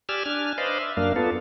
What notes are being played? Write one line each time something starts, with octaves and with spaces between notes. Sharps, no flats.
G4 D5 G#5 E6 F6
D4 G#5 F6
B4 C5 D5 D#5 F5
E5
F#2 A#3 D4 F5
B3 F4 A4